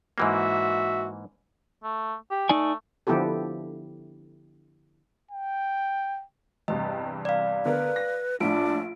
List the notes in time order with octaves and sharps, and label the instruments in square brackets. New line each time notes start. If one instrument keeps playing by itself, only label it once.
[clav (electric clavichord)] G#2 E3 A#3 [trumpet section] F#4 E5
[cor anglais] A3
G4
[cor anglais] A3 [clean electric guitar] D#4 D5 G#5
[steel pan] D3 F3 B3 E4 G4 A4
[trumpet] G5
[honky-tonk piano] E2 G2 C3 [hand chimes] D#5
[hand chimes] D5 F5
[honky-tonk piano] D3 B3 A#4 [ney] B4
[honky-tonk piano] A#6
[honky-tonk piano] A#1 A2 [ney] D4 [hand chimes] F4 D7